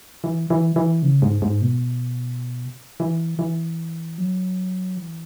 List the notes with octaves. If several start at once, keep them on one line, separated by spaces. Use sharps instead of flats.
E3
E3
E3
C#3
G#2
G#2
B2
E3
E3
F#3
E3